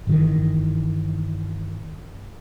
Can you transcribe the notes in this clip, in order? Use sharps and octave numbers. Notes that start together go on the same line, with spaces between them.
G1 D#3 E3